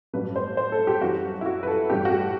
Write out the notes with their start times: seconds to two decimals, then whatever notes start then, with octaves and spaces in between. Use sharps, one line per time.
0.13 A1 G2 F#3 B4
0.36 C5
0.57 C5
0.72 A4
0.87 G4
1.02 F#2 E3 G3 F#4
1.41 E4
1.46 F#4
1.63 B4
1.67 A4
1.90 A1 G2 E3 G3 G4
2.05 F#4
2.11 G4